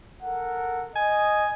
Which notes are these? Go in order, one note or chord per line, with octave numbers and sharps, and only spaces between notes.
A4 A#4 F#5
D#5 G#5